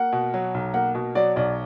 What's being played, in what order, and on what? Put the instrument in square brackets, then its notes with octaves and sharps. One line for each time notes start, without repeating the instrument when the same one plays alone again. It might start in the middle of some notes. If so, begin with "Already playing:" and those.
Already playing: [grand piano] A#3 [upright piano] F#5
[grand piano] B2
F#3
B1
[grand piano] A#3 [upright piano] F#5
[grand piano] B2
[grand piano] F#3 [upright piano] D5
[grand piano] B1 [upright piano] D5